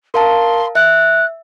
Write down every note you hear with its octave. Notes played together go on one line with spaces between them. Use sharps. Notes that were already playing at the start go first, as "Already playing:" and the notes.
A#4 F5 A5 C6
E5 F#6